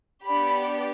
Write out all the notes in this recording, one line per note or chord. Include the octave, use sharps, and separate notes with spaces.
B3 D4 G4 B5